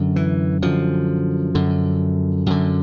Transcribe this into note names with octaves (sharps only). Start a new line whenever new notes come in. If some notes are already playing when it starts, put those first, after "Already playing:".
Already playing: F#2 D3
E3
F#2 D3 F3
F#2 D3
F#2 D3